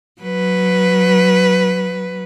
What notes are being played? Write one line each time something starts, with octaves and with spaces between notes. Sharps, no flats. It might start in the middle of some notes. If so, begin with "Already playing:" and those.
F#3 B4